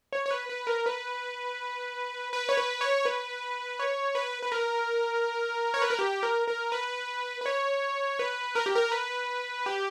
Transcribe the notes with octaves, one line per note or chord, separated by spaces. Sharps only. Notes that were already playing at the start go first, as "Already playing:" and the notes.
C#5
C#5
B4
B4
A#4
B4
B4
C#5
B4
C#5
B4
C#5
B4
B4
A#4
C#5
B4
A#4
G4
A#4
A#4
B4
B4
C#5
B4
A#4
G4
A#4
B4
G4